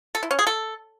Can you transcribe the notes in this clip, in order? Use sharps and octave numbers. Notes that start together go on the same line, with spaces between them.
A4
E4
C#4
G#4
A4